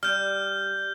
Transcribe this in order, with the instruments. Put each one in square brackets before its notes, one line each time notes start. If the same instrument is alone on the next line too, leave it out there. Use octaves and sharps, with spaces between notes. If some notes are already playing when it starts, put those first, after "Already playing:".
[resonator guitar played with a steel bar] G3 [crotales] F6 G6